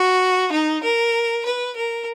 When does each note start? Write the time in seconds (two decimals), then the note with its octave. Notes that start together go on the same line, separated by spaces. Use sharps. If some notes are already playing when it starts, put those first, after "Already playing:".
Already playing: F#4
0.52 D#4
0.84 A#4
1.45 B4
1.77 A#4